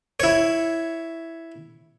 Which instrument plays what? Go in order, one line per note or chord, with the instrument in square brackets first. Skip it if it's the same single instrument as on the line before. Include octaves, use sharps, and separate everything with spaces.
[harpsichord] E4 C#5